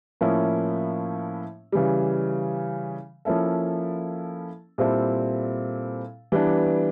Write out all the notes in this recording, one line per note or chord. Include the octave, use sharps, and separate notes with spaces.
A2 F3 A#3 C#4 E4
C#3 E3 G3
F3 A#3 C#4 E4 A4
A#2 G3 C4 E4 A4
E3 G3 B3 D4